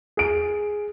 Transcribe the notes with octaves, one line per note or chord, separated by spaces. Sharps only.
G#4 D7